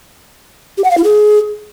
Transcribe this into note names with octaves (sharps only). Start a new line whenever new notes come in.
G4
F#5
F5
E4
G#4